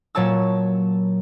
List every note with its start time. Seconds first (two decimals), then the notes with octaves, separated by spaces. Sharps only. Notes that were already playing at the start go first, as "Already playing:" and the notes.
0.15 A#2 F#3 C#5 A5 E6